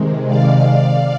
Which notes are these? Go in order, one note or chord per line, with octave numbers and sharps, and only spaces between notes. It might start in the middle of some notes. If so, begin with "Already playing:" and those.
Already playing: C3 D#3 G#3
D5 F5